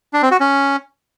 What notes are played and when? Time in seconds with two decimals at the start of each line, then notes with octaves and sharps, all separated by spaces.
0.13 D4
0.22 C4
0.31 F#4
0.40 C#4